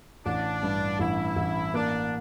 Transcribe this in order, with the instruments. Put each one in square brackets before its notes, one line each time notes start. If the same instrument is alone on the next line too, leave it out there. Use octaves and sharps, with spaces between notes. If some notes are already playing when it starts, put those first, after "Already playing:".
[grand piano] A1 [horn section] D4
[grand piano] G2
[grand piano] A1 [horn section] E4
[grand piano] A1
[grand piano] A#3 [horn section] D4